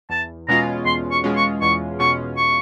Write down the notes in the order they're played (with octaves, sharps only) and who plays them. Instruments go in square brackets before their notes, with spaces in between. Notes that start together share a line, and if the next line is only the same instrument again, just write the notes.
[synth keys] E2 [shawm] A5
[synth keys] B2 G#3 C#4 F4 [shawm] A#5
[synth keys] E2 [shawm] C6
[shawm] C#6
[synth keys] B2 G#3 C#4 F4
[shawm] C#6
[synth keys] E2 [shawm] C#6
[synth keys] B2 G#3 C#4 F4 [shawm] C#6
[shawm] C#6